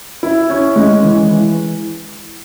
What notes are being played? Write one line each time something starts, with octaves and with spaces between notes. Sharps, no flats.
E4
C#4
G#3
E3
E3